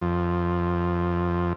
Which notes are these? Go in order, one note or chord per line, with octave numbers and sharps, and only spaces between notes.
F2